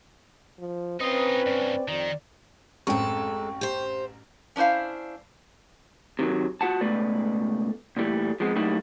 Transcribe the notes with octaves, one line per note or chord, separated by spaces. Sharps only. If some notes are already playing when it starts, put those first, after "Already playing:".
F3
C4 C#4 D#4 F4 B4 D#6
G2 C#3 D5
F2 D#3
A1 F#2 G#3 C4 A4 G5 C#6
G4 C5
C#4 D4 E4 C5 F5
C3 D#3 F3 F#3
F4 F#4 F#5 A5
C#2 B2 A3 B4 D5
A#2 E3 G3 A3
F3 G#3 B3 C4
F#3 G3 A3 A#3 D#4 E4